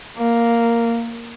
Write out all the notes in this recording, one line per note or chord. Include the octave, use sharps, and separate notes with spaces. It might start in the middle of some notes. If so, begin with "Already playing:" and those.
A#3